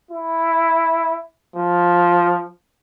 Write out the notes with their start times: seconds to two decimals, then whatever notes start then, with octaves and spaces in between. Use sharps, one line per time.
0.11 E4
1.56 F3